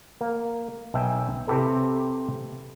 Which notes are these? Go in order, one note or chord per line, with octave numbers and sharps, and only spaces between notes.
A#3
B1 E5 G5 G#5
C3 C4 E4 G4 A4 B4